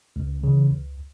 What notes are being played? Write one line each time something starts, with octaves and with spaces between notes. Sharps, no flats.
C#2
C#3 E3
C#2